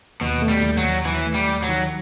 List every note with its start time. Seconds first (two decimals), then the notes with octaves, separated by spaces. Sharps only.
0.21 D#2 B2
0.42 A3
0.49 G3
0.63 D#2
0.77 F#3
0.84 D#2
1.05 D#2 E3
1.27 A3
1.34 G3
1.48 D#2
1.62 F#3
1.69 D#3